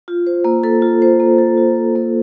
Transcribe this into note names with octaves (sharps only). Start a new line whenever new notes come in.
F4
C5
A#3
A4
F4
C5
A#3
A4
F4
C5
A#3